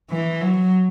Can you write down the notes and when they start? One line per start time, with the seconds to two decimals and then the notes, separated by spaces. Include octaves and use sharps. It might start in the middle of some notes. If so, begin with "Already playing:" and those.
0.11 E3
0.41 F#3